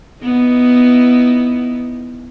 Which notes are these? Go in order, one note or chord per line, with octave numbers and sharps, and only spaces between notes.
B3 D#4 E4